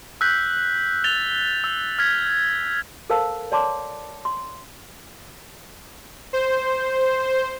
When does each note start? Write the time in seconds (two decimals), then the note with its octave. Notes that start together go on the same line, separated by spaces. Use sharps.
0.21 E6 F#6 G6 B6
1.04 A6 F7 G7
1.64 E6
1.99 F6 G#6 B6
3.10 A4 A#4 C5 F5 A5 E6
3.52 C#5 D5 A5 C6 D6
4.25 C6
6.33 C5